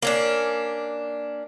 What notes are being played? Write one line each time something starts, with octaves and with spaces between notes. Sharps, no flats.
A#3 C#4 D4